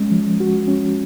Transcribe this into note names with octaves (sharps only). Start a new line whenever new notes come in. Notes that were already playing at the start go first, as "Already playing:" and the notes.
Already playing: G#3 C#4
F3
F#4
C#4